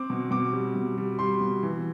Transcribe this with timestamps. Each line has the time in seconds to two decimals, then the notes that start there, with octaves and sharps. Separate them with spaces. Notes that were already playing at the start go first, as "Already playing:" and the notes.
Already playing: C4 D6
0.10 B2
0.31 B2 D6
0.53 G3
0.76 B2
0.98 G3
1.19 G3 C6
1.41 B2
1.63 E3